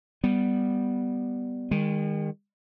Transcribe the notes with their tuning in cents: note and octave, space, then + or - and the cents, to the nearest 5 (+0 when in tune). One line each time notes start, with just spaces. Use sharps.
G3 +0 B3 +0
D#3 +0 G#3 -40